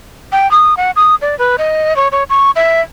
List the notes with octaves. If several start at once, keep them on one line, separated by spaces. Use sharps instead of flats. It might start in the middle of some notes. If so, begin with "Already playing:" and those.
G5
D#6
F#5
D#6
D5
B4
D#5
C#5
C#5
C#6
E5